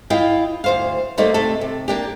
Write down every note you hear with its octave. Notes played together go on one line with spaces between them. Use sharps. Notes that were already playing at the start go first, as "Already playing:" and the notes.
E4 F4 D#5 F5 G5
D2 C5 F5
G3 A3 A#3 D#4 C5 D5
C3 A3 A4
C3
A#3 D4 G4